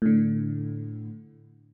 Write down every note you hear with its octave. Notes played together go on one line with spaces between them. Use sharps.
A2 D3